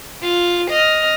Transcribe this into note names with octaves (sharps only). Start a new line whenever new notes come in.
F4
D#5 F6